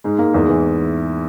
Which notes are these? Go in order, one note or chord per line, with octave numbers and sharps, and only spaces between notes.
G#2 G#3
G#2 A#3
E2 G#3
E3